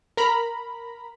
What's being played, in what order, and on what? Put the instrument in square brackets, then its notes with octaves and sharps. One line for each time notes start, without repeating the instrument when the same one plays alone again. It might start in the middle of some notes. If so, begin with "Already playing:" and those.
[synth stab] A#4 A#5 B5